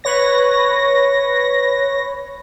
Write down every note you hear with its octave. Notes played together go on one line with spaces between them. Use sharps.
B4 C#5 A#6